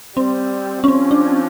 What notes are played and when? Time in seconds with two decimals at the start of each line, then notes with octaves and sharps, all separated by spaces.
0.17 G3 C4
0.84 C#4
0.88 F3 C4
1.11 D4